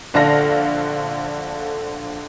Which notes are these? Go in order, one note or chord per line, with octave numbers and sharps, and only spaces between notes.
A#1 D3 A4 F5 A#6